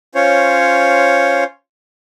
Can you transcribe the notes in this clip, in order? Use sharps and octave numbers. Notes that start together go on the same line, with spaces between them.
C#4 F4 C5 C#5